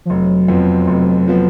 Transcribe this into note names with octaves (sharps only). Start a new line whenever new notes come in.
F3
F1 F#3
F2 F3 B3
F1
F3 B3